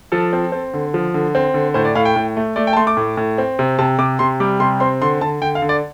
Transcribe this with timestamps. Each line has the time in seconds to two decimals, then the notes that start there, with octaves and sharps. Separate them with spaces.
0.12 F3 A4
0.33 C4
0.52 C4
0.74 D3
0.94 F3
1.14 D3
1.35 C4
1.54 D3
1.74 A2 C5
1.85 D5
1.95 A2 F5
2.05 G5
2.16 A2
2.37 A3
2.56 A3 D5
2.67 G5
2.73 A5
2.77 A3 C6
2.87 D6
2.97 A2
3.17 A2
3.38 C4
3.59 C3
3.79 C3 A5
3.99 C3 D6
4.19 C3 C6
4.40 G3 D6
4.60 C3 C6
4.80 C4 C6
5.02 D3 C6
5.21 D3 A5
5.41 D3 G5
5.55 F5
5.62 D3
5.69 D5